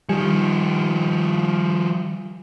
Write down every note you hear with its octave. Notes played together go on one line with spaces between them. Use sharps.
D#3 F3 G3 G#5 C#7